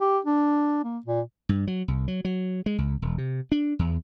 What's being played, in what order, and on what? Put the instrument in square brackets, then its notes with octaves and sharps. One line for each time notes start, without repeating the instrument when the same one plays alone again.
[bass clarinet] G4
D4
A#3
A#2
[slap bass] G2
F#3
C2
F#3
F#3
G#3
C#2
E1
C3
D4
E2